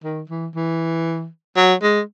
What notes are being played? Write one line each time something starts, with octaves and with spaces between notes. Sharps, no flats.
D#3
E3
E3
F#3
G#3